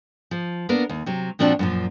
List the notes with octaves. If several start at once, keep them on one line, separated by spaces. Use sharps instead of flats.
F3
A#3 B3 D4 A#4
D#2
C3 F#3
A#2 F3 C4 D4 F#4
F#2 A#2 F3